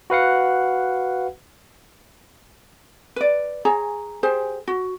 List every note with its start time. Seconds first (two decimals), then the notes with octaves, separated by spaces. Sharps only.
0.10 F#4 B4 F5 F#5
3.16 B4 D5
3.65 G#4 C#5 A#5
4.23 G4 G#4 C5
4.68 F#4